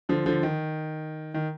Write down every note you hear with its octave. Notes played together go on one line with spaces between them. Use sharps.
D3 F3
D3 F3
D#3
D#3